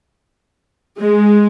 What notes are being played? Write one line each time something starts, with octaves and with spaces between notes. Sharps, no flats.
G#3